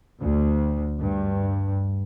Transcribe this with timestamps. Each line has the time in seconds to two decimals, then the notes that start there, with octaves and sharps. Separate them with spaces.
0.22 D2
1.01 G2